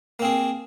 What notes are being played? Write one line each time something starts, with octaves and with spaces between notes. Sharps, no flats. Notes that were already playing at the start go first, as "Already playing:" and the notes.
A#3 C4 G#4